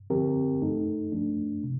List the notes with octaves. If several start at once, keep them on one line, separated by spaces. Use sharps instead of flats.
D3 F3 C4 G4 A#4
A3 D#4 A4
F3 A3 D4
C3